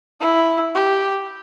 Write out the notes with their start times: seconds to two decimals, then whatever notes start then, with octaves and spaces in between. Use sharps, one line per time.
0.20 E4
0.75 G4